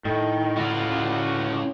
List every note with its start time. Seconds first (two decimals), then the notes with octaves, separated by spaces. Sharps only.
0.05 A2 D#3
0.57 C#3 F4 F#4 D5